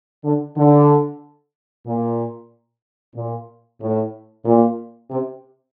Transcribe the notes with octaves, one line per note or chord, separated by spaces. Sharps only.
D3
D3
A#2
A#2
A2
A#2
C3